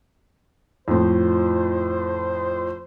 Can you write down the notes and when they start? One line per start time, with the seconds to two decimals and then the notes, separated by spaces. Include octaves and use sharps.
0.88 F2 A2 C5